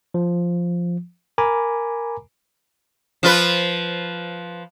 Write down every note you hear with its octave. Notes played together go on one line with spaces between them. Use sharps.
F3
A#4 G#5 A#5 B5 D6
F3 F4 B4